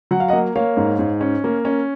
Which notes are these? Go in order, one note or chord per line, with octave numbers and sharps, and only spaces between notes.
F#3 F#5
F5
D#5 F#5
A#3
A#3 C#5 F5
G#2
G#2
C#4
A#3
C#4